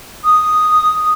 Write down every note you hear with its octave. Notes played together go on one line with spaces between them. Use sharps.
D#6